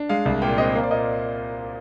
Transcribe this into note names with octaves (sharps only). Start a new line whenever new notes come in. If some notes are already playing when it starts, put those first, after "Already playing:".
Already playing: D4
G#3 F5
C2
A#2 G5
C4 D#5
A#3 C5
D5
A#2 D#5